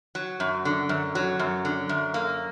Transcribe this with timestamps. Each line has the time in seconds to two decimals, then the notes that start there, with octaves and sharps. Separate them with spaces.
0.15 F#3
0.40 F#2
0.65 D3
0.89 F#2
1.15 F#3
1.39 F#2
1.65 D3
1.89 F#2
2.14 A#3